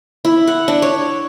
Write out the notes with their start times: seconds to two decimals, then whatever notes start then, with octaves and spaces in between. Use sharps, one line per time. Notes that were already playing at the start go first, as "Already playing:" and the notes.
0.25 E4
0.47 F#5
0.68 D4
0.82 C#5